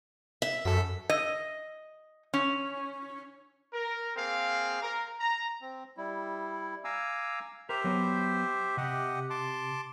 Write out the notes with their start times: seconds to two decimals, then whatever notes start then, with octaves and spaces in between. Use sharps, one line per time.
0.42 E5
0.65 F#2 A4 B6
1.10 D#5
2.34 C#4
3.74 A#4
4.16 A#3 C4 G#4 F5
4.83 A#4
5.20 A#5
5.61 C4
5.97 G3 E4
6.84 F5 G#5 A#5 D6 E6
7.69 G4 A#4 C5 E5
7.84 F#3 B3
8.77 C3 G4 D#5 F#5
9.30 A5 C6 D6